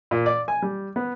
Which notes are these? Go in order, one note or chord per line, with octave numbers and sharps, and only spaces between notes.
A#2
D5
G#5
G3
B3